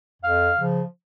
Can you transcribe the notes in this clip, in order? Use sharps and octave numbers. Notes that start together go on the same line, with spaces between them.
F2 F5
C#3 F3